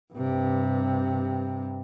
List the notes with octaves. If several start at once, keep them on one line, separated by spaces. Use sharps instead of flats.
G2 C3